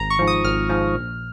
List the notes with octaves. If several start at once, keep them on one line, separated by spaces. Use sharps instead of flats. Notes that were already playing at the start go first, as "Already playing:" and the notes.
Already playing: G#1 A#5
C#6
G#2 F3
D#6
G#1 F6
G#2 F3
A#1